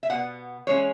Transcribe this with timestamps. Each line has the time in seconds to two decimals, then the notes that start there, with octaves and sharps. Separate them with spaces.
0.03 E5
0.10 B2 B3 F#5
0.67 E3 G#3 C#4 C#5